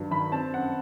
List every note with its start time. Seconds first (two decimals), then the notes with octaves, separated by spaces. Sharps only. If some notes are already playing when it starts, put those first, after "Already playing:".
Already playing: G2 D#3 F#3
0.11 D#3 B5
0.32 C4 A5
0.54 F#2 F#5